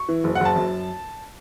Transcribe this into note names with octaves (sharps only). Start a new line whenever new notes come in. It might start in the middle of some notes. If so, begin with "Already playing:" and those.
Already playing: C#6
E3
F#1
F#5
F#1 A5
F#2